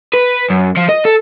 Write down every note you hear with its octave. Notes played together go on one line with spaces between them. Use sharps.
B4
F#2
F3
D#5
A4